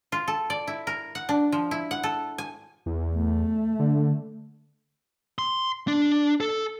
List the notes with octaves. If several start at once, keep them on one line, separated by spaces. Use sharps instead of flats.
F4
A4
D5
E4
A#4
F#5
D4
F3
E4
F#5
A4
G#5
E2
A3
D3
C6
D4
A4